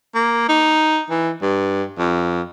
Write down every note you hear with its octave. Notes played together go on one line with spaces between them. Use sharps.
A#3
D#4
E3
G2
F2